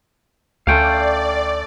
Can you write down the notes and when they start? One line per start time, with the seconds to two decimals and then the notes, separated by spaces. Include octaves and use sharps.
0.67 D2 A3 C#4 D5 F5 G5 C6